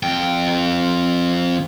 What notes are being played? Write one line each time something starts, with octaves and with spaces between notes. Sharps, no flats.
F2 G5